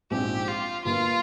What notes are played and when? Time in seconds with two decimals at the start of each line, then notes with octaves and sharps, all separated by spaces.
0.11 A#1 G#2 F3 C4 G4
0.48 F4
0.85 G1 G2 G3 A#3 F4